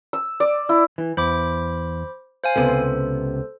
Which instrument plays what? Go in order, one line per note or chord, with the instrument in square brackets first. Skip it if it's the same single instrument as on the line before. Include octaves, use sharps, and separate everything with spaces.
[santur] E6
D5
E4
[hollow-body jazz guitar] E3
[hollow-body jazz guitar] E2 [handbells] C5 B5 D6
[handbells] C5 F5 G#5
[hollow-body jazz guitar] C#2 C3 B3 [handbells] A4 C5